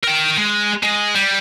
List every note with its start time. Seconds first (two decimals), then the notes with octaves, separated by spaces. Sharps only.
0.04 A#4 G5
0.38 G#3
0.83 G#3
1.15 G3